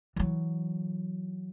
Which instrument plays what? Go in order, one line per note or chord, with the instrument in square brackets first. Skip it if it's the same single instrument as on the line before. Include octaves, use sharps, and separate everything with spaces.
[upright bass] E3 F#3